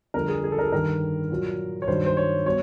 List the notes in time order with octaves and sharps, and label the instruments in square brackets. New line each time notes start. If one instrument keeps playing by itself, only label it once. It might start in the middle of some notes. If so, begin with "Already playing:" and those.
[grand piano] F2 D3 G3 A#4
G#4
G#4
A4
A#4
A4
G2 D#3 G3 A#4
A#2 F#3
C#5
G2 D#3 F#3 C5
C5
C#5
B2 G3 C#5